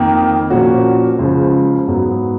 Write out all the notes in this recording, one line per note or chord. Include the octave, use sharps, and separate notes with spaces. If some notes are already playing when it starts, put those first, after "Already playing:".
Already playing: F2 D#3 A#3
A#2 F3 A#3 C#4 F#4
C#2 C#3 F3 G#3
G#2 F#3 B3